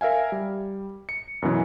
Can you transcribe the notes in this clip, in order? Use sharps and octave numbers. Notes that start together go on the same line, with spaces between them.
A#4 E5 F5 G#5
G3
C#7
F#2 B2 E3 C#4